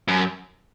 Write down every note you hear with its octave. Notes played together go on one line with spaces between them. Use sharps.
F#2